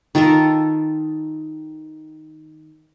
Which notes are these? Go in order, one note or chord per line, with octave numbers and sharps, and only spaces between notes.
D#3 F4 A4 A#4